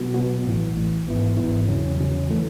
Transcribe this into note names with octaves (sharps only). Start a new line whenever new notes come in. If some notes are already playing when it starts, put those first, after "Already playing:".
Already playing: B2 F#3 B3 F#4
B2 F#3 B3 F#4
A1 A2 E3
A1 A2 E3
G#1 G#2 E3 B3 E4
G#1 G#2 E3 B3 E4
E2 C#3 F#3 C#4
E2 C#3 F#3 C#4
E3 A3